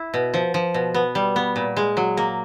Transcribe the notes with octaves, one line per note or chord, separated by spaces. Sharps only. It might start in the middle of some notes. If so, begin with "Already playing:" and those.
Already playing: E4
B2
F3
F3
B2
B3
G3
B3
A#2
G#3
F#3
A#3